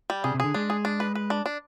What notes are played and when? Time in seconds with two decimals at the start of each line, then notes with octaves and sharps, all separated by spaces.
0.10 G3
0.24 C3 G#4
0.34 C3
0.40 D3 G#4
0.54 G#3 D4
0.70 G#4
0.85 D4
1.00 B4
1.15 B4
1.30 D4
1.46 D4